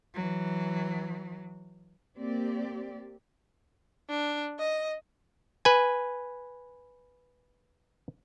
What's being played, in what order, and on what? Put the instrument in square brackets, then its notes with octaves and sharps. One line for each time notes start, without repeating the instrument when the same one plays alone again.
[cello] E3 F#3
[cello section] A#3 C4 G4 D5
[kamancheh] D4
D#5
[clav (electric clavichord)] B4 G#5